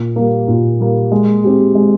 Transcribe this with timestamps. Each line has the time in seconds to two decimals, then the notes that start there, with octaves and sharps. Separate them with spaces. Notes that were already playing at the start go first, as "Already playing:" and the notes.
Already playing: A#2
0.16 G3 A#3
0.48 A#2
0.80 G3 A#3
1.12 G#3
1.44 C4 G4
1.75 G#3